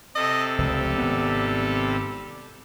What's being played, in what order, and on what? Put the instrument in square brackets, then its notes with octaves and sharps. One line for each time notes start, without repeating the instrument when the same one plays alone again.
[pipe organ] C3 A4 [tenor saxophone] D#5
[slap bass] F1 C#2 F3 [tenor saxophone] G3
[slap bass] G#1 B3